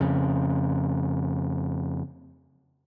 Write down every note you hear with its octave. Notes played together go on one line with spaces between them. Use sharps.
F2 C#3